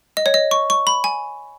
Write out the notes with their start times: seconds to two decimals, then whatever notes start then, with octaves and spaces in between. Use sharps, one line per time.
0.17 D#5
0.26 C#5
0.34 D#5
0.51 C#6
0.70 C#6
0.87 B5
1.04 G#5